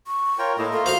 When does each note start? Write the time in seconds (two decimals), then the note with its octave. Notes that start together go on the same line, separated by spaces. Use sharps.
0.07 C#6
0.39 F4 A#4 C#5 G5
0.58 A2 A3 A#3 D#5 B5
0.72 F4 A4
0.86 F#4 C5 F5 C6